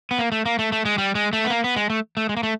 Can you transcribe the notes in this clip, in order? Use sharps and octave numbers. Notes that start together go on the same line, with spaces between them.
B3
A#3
A3
A#3
A3
A3
G#3
G3
G#3
A3
B3
A#3
B3
G#3
A3
A3
G#3
A#3
A3